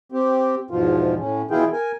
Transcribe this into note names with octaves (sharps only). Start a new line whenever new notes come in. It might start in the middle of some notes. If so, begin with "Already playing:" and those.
C4 G4
E2 G#2 B2 F3 F4
A2 C#4
B2 E3 E4 F4 G#4 G5
A#4 G#5